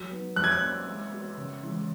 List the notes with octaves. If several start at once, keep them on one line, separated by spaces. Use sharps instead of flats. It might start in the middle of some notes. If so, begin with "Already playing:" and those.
Already playing: F#3
B3 D#4
F#3 F#6
G#6
F#6
A#3 C#4
G#3
B3 F#4
C#3
E3 G#3